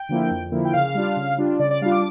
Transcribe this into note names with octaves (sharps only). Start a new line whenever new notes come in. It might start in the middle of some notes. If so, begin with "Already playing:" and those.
Already playing: G5
D3 F3 A#3 E4
F2
D3 F3 A#3 E4
G5
C#3 F5
G3 D4 F4
C#3
G3 D4 F4
C#3 D5
D5
G3 D4 F4 F5
D6